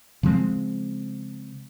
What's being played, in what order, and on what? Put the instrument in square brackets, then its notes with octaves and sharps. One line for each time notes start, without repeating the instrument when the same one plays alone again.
[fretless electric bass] C#3 F3 G#3 C4